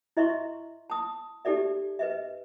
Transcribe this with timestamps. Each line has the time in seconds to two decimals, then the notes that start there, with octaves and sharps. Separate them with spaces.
0.17 E4 D#5 E5 C6 C#6
0.90 A5 D#6
1.45 D#4 G4 A4 D5 E5
1.99 B4 D#5 E5